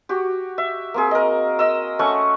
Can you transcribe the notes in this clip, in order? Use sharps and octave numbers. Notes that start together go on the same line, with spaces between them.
F#4 G4
E5
A#3 C4 G#4
A#4 D#5
D#5 E6
A3 C#4 F#5 C#6